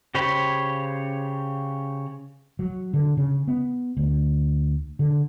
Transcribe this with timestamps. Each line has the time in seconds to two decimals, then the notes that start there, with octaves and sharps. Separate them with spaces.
0.15 C#3 G4 C5 C#5 B5
2.59 F#3
2.94 D3
3.17 C#3
3.47 B3
3.97 D2
4.99 D3